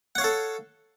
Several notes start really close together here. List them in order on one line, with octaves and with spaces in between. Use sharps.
F#5 C#5 F5 A4